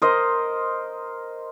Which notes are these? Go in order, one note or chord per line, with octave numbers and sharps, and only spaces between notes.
A#4 C5 D#5